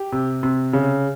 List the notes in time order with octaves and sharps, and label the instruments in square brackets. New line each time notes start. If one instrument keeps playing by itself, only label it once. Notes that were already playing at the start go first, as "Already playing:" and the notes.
Already playing: [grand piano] G4
C3
C3
C#3